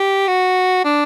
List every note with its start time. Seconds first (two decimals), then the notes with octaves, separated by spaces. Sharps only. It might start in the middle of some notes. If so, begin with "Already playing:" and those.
Already playing: G4
0.28 F#4
0.85 D4